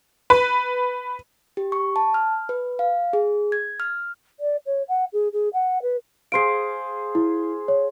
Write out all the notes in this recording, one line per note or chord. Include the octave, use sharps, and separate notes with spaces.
B4
G4
C#6
A5
F6
B4
F5
G#4
G#6
F6
D5
C#5
F#5
G#4
G#4
F#5
B4
G#4 C5 F5 C7 D7
E4
C#5